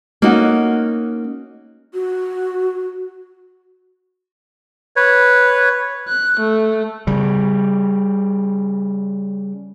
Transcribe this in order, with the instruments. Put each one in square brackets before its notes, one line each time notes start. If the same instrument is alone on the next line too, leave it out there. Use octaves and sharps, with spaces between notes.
[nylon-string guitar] A#3 C#4 D#4 F#4
[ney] F#4
[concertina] B4 C#5
[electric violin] F#6
A3
[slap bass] C#3 G3